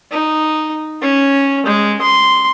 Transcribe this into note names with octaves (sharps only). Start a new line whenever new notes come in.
D#4
C#4
G#3
C6